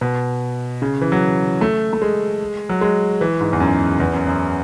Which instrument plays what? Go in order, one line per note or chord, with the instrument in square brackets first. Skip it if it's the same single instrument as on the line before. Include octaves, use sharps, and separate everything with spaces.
[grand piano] B2
C#3
E3
F#3
A3
A3
G#3
F#3
G#3
E3
G#2
E2
F#2
E2
F#2
F#2